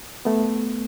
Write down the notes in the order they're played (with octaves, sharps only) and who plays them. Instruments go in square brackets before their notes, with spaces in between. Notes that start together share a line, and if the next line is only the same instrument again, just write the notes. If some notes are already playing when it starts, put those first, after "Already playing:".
[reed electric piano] A3 B3